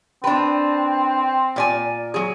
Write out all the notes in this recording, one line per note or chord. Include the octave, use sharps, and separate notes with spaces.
C4 D4 B4
A#2 D5 G#5
F#3 G#4